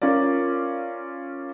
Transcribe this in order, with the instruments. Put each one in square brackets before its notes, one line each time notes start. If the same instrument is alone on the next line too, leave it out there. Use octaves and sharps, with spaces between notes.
[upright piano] C#4 F4 A#4 D5